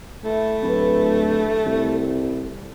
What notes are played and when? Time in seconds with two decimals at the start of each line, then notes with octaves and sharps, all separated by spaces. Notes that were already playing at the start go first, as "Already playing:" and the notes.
0.24 A3 E4 G5
0.63 D1 G4 B4 G#5
1.66 C2